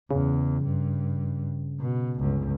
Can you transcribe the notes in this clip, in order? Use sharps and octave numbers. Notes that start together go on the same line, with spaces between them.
E2 C#3
G2
B2
G1 C#2